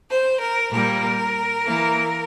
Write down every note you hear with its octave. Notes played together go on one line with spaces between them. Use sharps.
C5
A#4
A#2 G3 A#3 A#4
E3 A#3